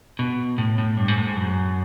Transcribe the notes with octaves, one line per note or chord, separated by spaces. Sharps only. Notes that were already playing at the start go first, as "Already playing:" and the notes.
B2
A2
A2
G2
G#2
A2
G#2
F#2